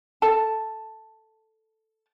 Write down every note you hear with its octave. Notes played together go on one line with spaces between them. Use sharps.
A4 A5